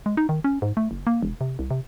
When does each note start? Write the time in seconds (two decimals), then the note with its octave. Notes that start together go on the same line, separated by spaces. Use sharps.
0.06 G#3
0.17 D#4
0.29 D#3
0.44 C#4
0.62 G#2
0.77 A3
0.91 F#1
1.07 A#3
1.23 E1
1.41 C3
1.59 C2
1.71 C3